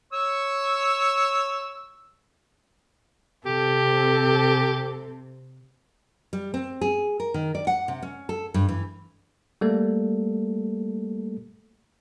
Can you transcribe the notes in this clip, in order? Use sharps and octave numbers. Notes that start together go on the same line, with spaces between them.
C#5 C#6 E6
C3 G4 A4
G3
C4
G#4
A#4
D#3
D5
F#5
C3
C#4
A4
G2
E3
G3 A3 A#3 A4